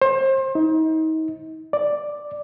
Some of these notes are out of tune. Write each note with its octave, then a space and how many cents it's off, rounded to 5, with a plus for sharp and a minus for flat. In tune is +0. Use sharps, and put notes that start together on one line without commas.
C5 +30
D#4 +35
D5 +5